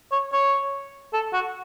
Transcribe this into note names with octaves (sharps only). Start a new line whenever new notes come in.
C#5
C#5
A4
F#4